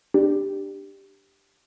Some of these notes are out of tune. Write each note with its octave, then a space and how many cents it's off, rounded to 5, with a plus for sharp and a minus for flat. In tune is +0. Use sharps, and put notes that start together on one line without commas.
D4 +15 G4 +0